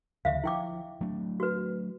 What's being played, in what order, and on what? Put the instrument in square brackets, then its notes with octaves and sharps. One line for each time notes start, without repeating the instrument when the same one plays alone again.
[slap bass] D2 C#3 F3 [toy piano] E5 F5
[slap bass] F3 [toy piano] E4 G5 D6
[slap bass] F#3 A3 D4
[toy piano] F#4 B4